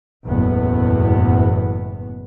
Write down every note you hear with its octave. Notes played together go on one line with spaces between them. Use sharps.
F#1 E2 A2 B3